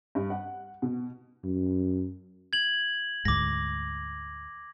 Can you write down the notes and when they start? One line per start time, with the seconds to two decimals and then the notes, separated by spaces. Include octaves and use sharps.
0.15 G2
0.30 F#5
0.82 B2
1.44 F#2
2.53 G#6 F#7
3.25 D2 G#2 D6 A#6